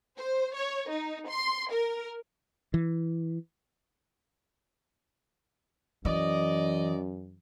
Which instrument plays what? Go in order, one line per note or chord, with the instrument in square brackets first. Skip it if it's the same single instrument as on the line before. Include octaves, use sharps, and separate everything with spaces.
[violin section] C5
C#5
D#4
C6
A#4
[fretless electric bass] E3
[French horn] F#2 [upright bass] E3 [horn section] D5 D#5